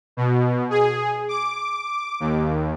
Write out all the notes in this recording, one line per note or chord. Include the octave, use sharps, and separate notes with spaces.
B2
G#4
D6
D#2